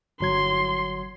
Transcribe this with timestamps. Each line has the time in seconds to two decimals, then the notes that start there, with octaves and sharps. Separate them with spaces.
0.20 G1 F#3 C6 G#6